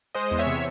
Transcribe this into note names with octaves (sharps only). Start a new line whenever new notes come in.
G#3 C5 D#5
E2
C#5 E5
C3